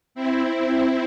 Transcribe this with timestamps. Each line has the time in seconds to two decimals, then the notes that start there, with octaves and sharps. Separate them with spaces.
0.15 C4 E4
0.57 C4 E4